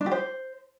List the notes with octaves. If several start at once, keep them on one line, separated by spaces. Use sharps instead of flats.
D4
G4
C5